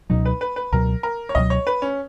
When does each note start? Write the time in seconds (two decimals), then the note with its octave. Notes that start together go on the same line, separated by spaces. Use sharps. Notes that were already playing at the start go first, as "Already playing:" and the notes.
0.10 C#2 B2 F#3 D#4
0.25 B4
0.41 B4
0.56 B4
0.72 C#2 B2 F#3 A#4
1.03 A#4
1.29 C#5
1.35 C#2 B2 F#3 D#5
1.50 C#5
1.67 B4
1.82 C#4